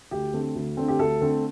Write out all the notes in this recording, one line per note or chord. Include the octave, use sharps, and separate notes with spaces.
D2 G4
D3 A3 C4
D2
D3 A3 C4
G4
D2 A4
D3 A3 C4